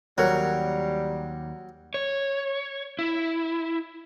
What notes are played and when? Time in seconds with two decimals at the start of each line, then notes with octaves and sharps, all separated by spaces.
0.18 D#2 F#3 G3 A#4 C#5 F#6
1.94 C#5
2.99 E4